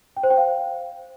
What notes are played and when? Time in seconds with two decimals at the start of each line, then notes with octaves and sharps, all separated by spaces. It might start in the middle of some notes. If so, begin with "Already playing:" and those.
0.17 G5
0.23 C5
0.30 G5
0.37 F5